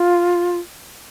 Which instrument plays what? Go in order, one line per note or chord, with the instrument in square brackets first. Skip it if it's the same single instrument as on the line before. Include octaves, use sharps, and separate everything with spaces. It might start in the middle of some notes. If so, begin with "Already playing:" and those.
Already playing: [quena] F4